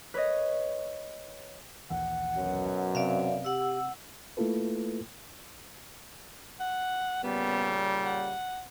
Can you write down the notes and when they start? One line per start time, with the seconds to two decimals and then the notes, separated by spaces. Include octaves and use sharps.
0.14 B4 C#5 D#5
1.90 A#1 D#2 E3 F#5
2.36 F#2 B2 F#3
2.95 C3 C4 D5 E5 F5
3.44 G4 F#5 E6
4.37 A3 A#3 E4 F4 A4 B4
6.60 F#5
7.23 A#2 C#3 G3 B3
8.04 F#5